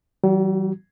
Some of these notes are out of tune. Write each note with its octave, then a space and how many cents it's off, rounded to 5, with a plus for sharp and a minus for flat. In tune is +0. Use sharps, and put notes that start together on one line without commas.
E3 +0 G3 -40 F#4 +0